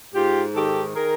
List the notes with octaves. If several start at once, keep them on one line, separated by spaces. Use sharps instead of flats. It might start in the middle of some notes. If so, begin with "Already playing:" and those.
G#2 F4 G4
D#3 G4 A4
D#3 G#4 A#4